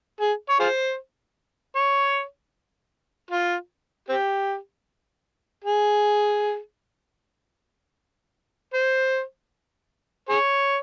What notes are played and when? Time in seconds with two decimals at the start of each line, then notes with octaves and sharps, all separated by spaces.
0.21 G#4
0.50 C#5
0.60 F4 G#4 C5
1.76 C#5
3.31 F4
4.09 C4 G4
5.64 G#4
8.74 C5
10.29 G#4 C#5